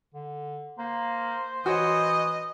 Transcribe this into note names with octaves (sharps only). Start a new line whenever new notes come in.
D3
A#3 C5
E3 F#4 C#5 D#5